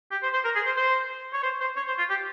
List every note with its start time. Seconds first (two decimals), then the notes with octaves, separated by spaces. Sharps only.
0.11 G4
0.22 C5
0.33 C5
0.44 A#4
0.55 G#4
0.66 C5
0.77 C5
1.33 C#5
1.43 C5
1.60 C5
1.76 C#5
1.87 C5
1.98 F4
2.09 G4